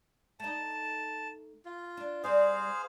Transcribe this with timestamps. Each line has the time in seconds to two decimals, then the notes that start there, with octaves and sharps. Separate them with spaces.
0.40 A3 D#4 A5
1.65 F4
1.97 D4
2.24 G3 C4 G#4 C5 D5 F5